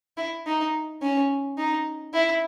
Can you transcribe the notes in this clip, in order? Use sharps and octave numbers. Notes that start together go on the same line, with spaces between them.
E4
D#4
C#4
D#4
E4